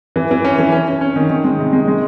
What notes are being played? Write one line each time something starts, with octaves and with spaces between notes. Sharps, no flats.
E3
E3
C#4
E3
C#4
C#4
C#4
D#3
D#3
G#3
C3
G#3
G#3